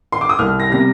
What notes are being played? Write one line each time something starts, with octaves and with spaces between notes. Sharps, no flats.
C6
D6
D#6
C2 F6
A#6
C3 G3 A#6